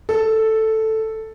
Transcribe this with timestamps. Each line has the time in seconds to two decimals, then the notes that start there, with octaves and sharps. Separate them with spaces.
0.09 A4